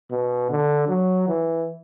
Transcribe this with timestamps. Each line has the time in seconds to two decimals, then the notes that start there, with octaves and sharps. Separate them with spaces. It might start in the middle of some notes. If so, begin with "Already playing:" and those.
0.11 B2
0.50 D3
0.89 F#3
1.28 E3